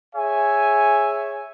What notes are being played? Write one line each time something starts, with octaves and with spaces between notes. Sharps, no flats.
G#4 C#5 E5 G#5